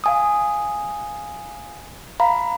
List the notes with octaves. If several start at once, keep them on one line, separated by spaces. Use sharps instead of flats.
F5 G#5 D#6
F5 A#5 B5